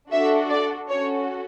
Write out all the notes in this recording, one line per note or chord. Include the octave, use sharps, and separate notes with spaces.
D4 F#4 A4 E5
D5
C#4 F#4 A4 C#5